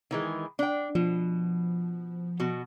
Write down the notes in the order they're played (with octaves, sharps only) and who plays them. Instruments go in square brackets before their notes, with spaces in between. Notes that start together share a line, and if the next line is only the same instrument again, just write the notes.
[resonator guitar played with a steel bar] D#3 E3 G#3
D4 G5
[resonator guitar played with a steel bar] B2 [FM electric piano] F3
[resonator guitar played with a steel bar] B2 F#4